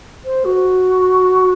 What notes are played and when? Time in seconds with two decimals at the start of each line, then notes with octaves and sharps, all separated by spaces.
0.25 C5
0.45 F#4